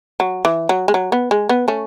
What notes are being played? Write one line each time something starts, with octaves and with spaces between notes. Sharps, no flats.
F#3
E3
F#3
G#3
F#3
B3
G#3
B3
A3 C#4